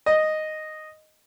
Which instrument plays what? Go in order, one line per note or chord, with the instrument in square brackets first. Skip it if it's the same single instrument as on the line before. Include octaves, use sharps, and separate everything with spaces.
[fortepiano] D#5